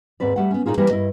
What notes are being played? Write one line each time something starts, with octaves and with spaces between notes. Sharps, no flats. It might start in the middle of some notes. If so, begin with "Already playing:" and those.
D#2 G#2 C4 B4 D5
G3 A3 F#5
B3 C#4
A#2 D#3 D#4 F4 G#4
E3 G3 A#3 C4 E4 A#4
G2 E4 D#5